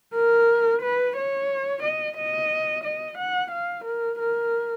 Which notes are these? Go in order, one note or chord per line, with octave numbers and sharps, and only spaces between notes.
A#4
B4
C#5
D#5
D#5
D#5
F#5
F5
A#4
A#4